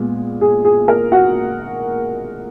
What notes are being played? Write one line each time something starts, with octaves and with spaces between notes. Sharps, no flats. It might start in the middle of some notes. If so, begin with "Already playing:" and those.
Already playing: A#2 G#3 B3
G#4
G#4
A#4
F#4 F#5